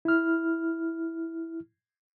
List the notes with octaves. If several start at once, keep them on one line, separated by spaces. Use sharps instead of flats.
E4 F6